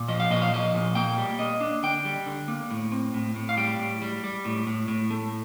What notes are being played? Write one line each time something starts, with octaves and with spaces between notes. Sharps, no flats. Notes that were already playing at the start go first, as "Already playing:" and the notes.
Already playing: A#2
F3 D#5
F5
A#2 D#5
F5
F3 D#5
A#2
A#3 G5
G3
A#3 D#5
D4
D3 G5
G3
D3
A#3
A2
C4
A2
A2
F5
G3 G5
A2
G3
G3
A2
A2
A2
A3